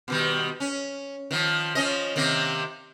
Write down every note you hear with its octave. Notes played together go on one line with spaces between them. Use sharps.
B2 D#3 G3
C#4
D#3 F3
F3 C#4 D#5
C3 D#3 A#3